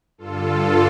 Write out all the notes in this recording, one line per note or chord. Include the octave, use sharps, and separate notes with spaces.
G2 D3 F4 A4